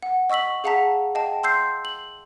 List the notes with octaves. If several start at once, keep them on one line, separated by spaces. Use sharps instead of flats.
F#5
D#5 C#6 E6 B6 F#7
G#4 F5 F#5 A5 A#5 B6
D#5 F5 G5 A5
C6 E6 G6 C7
F#7